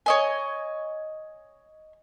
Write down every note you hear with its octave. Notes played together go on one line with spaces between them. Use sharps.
C#5 D#5 G#5